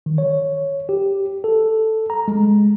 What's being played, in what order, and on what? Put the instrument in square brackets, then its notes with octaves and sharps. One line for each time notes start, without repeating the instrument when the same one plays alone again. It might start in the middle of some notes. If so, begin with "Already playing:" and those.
[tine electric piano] D#3
C#5
G4
A4
A#5
G#3